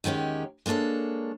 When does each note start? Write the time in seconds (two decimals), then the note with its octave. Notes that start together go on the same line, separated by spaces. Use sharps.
0.04 E2 D#3 G#3 C#4 G4
0.66 G#3 A#3 D4 A4 C#5